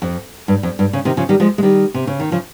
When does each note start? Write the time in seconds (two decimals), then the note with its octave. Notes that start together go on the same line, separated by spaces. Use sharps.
0.02 F2
0.48 G2
0.63 F2
0.79 G2
0.93 C#3
1.05 C3 D#3
1.17 C#3 F3
1.29 D#3 G3
1.40 F3 G#3
1.58 G#3
1.63 D#3 G3
1.94 C3
2.07 C#3
2.20 D#3
2.31 C#3 F3